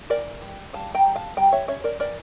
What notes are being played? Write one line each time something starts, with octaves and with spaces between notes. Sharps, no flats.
E3 A#4 D5
G3
G3 F5 A5
G5 A#5
G3
F5 A5
G3 G5 A#5
C#5 E5
C#4 C#5 E5
A#4 D5
E3 A#4 D5